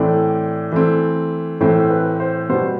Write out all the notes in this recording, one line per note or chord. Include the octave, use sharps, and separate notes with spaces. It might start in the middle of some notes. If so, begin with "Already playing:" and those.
Already playing: A2 E3 A3 C4 D5
E3 A3 C4
A2 E3 A3 C4 C5
B4
C5
B2 G3 B3 C5